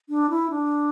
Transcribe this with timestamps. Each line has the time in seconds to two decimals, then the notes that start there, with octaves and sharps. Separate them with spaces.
0.09 D4
0.30 E4
0.50 D4